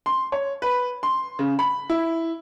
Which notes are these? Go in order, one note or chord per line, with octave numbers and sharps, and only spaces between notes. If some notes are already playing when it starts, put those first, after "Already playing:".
C6
C#5
B4
C6
C#3
B5
E4